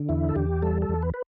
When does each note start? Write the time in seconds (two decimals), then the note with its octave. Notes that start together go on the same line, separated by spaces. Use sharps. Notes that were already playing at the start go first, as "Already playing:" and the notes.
Already playing: D3
0.09 E2 E4
0.29 A4
0.35 E2 G4
0.62 G3 A4
0.82 A4
0.89 E2
1.02 B4
1.14 B4